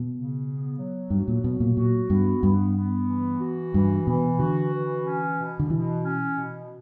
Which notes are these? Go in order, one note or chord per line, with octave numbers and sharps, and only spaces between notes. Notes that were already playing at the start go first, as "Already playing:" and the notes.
Already playing: B2
C#3
B3
F#3
G2 F#4
A#2
B2 F#3
A#2
A#2 F#4
G2 B3
G2 B3
B3
E3
F#4
G2 E3
B2 E3
D3 F#4
E3
C#4
B2
D3
B2 E3
C#4
B2